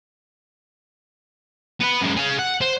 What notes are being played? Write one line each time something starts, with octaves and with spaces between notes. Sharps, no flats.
B3 B4
F#2 G#3
G#4 F5
F#5
C5